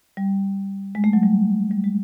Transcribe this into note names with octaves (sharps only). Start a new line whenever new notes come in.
G3
G#3
A3
F#3
G3
G3
G#3